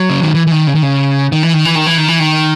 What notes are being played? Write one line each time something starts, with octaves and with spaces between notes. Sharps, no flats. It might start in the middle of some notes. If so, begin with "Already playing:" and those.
Already playing: F#3
C#3
D#3
E3
E3
D#3
C#3
D#3
C#3
D#3
E3
D#3
E3
D#3
E3
D#3
E3
D#3